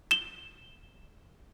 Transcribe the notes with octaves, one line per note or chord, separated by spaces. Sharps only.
E7 G7